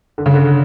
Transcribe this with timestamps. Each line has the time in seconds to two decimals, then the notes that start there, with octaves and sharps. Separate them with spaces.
0.18 D3
0.26 C#3
0.34 D3